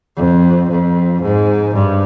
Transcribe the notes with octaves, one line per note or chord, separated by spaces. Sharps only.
F2
F2
G#2
G2